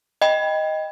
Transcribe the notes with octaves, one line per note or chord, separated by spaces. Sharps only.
D#5 G5 B5